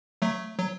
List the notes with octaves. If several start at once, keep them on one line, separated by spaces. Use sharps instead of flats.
F#3 A3
F#3